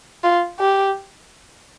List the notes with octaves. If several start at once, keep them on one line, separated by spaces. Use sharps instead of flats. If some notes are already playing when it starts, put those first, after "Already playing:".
F4
G4